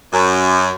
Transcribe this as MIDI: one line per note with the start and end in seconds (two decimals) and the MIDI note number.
0.13 0.74 42